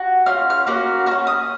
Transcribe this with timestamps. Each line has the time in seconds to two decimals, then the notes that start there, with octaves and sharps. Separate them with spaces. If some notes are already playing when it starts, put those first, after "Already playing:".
Already playing: F#4
0.26 C#4 F4 F6
0.50 F6
0.67 A#3 C#4 F#4
1.06 F#4 F6
1.11 C#4
1.27 D#6